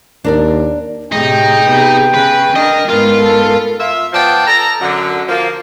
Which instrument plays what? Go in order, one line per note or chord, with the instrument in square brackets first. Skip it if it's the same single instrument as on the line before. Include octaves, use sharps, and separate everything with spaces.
[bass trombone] D#2 [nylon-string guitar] D4 A#4 D5
[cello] A2 C3 [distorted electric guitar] D#4 [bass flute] G#4 [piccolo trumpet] G5
[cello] C3 B3
[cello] C#3 [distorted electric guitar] B4
[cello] D4 A#4 [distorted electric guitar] D#5
[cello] G#2 B3 [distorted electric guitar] F4 F5 [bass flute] A#4
[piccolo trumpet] A4
[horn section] F4 E5
F3 B3 D5 G5 A5
A4 A5 A#5
F#2 D3
F3 A#3